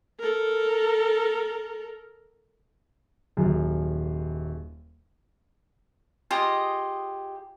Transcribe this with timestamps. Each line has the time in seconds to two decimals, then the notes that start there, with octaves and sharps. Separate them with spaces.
0.20 A4 A#4
3.37 D#1 F#2 G#4
6.31 F4 G4 G#4 D#5